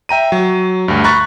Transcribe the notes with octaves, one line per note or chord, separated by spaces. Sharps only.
E5 G5 A#5 D#7
F#3
D2 G2
A#5 B5 C#6 F#6 A6